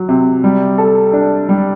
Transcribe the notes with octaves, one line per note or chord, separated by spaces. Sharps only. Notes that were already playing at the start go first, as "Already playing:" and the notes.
Already playing: F#3
C3
G3
A4
D4
G3